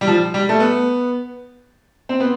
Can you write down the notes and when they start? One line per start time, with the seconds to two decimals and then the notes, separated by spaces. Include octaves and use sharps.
0.01 G3
0.07 F3
0.34 G3
0.49 A3
0.60 B3
2.09 C4
2.20 B3